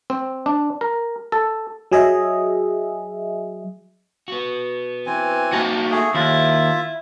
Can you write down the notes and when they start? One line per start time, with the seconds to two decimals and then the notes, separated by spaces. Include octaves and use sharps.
0.10 C4
0.46 D4
0.81 A#4
1.32 A4
1.92 F#3 G#4 D#5 E5
4.28 B3 F#4
5.06 E3 C4 G#5
5.53 A#3 D#4 F#4 A5
5.91 A3 G#4
6.14 D#2 E4 F4 E5